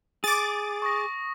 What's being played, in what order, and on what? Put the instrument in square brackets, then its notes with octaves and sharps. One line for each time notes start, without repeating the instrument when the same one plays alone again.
[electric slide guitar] G#4 [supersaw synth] D6 A6
[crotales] C#6 D#6 A#6